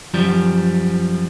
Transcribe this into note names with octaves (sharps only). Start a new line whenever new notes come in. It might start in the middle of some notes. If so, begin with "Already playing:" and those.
F#2 F3 G3